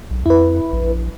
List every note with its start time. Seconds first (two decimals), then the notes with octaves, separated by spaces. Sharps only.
0.11 B1
0.26 F2 E4 B4
0.72 A#1